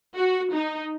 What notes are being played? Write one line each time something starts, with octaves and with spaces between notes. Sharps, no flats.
F#4
D#4